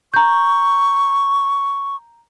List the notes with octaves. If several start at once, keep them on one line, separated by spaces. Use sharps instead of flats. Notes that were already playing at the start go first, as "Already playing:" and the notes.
A#5 C#6 G6